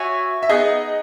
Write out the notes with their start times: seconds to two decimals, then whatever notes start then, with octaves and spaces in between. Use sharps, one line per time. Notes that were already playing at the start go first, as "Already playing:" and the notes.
Already playing: F#4 C#5 E5 G#5
0.43 E5
0.49 B3 D#4 G#4 D#5